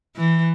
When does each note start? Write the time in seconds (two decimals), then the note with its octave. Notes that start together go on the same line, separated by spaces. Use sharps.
0.17 E3